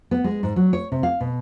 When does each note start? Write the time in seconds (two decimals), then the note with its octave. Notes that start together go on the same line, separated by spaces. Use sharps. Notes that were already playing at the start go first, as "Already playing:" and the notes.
0.11 B3
0.24 G#3
0.43 G#2
0.56 F#3
0.73 C#5
0.92 C3
1.03 F5
1.21 B2